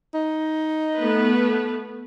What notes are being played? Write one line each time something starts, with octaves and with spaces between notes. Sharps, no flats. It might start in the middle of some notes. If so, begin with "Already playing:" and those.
D#4
A3 B3 B4